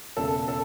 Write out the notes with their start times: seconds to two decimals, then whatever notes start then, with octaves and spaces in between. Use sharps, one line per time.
0.17 E1 E2 C#3 A4
0.48 A4